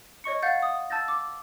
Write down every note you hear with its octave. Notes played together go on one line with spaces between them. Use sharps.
C#5 D#5 C#6 C#7
F5 F#5 G6 A6
D#6
A5 E6 G6 A6 A#6
D6